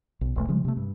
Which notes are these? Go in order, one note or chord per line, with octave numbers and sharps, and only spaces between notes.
B1
E1 B1 A3
C#3 F3 G3 G#3
C3 A3
G2